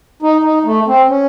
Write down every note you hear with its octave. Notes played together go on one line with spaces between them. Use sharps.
D#4
D#4
A3
C4
C#4